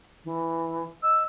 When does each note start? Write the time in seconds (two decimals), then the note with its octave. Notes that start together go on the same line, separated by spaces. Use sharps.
0.24 E3
1.03 D#5 E6